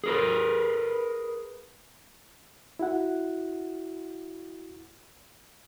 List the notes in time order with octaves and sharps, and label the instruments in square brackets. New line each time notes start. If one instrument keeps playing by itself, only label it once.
[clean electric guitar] G#4 A#4 B4
[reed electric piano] E4 F#4 F#5